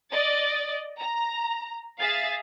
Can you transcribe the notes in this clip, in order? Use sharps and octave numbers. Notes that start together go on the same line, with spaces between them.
D5 D#5 A6
A#5
G#4 E5 F5 A6